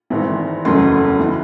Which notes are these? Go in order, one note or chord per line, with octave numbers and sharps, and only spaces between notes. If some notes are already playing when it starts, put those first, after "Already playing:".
G#1 G#2 E3 C4
F#1 E2 C#3 F#3 A3 C6
E3